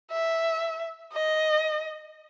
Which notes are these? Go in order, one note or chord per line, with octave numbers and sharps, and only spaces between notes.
E5
D#5